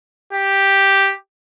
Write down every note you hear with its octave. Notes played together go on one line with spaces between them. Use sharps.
G4